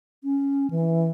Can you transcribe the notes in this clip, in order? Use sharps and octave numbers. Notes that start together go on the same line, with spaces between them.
C#4
E3